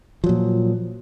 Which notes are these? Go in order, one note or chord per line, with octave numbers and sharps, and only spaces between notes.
A#2 F3 F#3